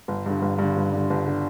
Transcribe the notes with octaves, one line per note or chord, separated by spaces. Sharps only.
G1
G2 D3
G1
G2 D3
G1
G2 D3
G1
D3